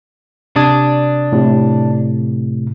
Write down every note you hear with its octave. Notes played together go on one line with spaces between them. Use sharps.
C3 D4 D#6 G#6
A2 C3